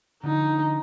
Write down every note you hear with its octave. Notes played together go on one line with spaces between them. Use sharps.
D3 F3 D#4